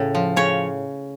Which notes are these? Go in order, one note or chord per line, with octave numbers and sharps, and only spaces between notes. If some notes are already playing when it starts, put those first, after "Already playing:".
Already playing: A2 C#3
F3
C#3 C#5